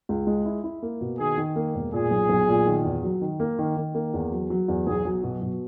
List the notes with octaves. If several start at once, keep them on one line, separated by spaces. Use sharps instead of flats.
C#2
G#3
E4
E4
A#3
B2
D#3 G#4
D#3
A#3
E1
A#2 G#4
B1
B1
A#2
D#3
E2
F#3
D#3
A#3
D#3
D#3
A#3
E2
F#3
F#3
E2
B1 G#4
F#3
B2
B2